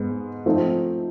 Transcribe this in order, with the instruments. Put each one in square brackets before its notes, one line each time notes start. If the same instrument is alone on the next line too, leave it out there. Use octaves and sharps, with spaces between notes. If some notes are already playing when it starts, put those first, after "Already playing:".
Already playing: [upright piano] G#2 G#3 B3
F3 A3 C4 D#4